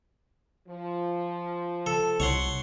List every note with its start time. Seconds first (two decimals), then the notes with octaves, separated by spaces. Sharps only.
0.68 F3
1.86 A4
2.20 C2 C#5 F#5 C6